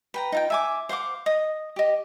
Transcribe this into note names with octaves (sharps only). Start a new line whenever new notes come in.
B4 G5 A#5
D#4 F4 G5
E5 G#5 D6
C5 F5 F#5 D6
D#5 D#6
G4 D#5